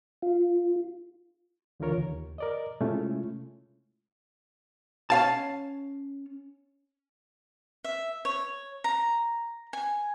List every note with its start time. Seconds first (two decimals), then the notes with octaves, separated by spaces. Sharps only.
0.22 F4
1.80 C#2 D3 E3 F4 A#4 C#5
1.98 D#2
2.38 A#4 D5 D#5
2.81 C3 G#3 A3 C#4 E4 F4
5.10 C#4 F5 A5
7.84 E5
8.25 C#5
8.84 A#5
9.73 G#5